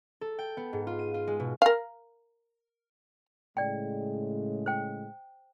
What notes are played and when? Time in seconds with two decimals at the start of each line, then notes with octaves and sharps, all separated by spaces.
0.21 A4
0.39 G5
0.57 B3
0.73 G#2
0.87 F4
0.99 D#7
1.14 F4
1.27 G#3
1.40 B2
1.62 A#4 F5
3.57 A2 C#3 G#3 D5 G5
4.66 C5 G5